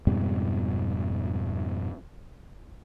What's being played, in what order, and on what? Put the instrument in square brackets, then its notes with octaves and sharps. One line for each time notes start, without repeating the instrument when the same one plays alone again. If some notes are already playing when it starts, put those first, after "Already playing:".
[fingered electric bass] F2 G#2 B2 G3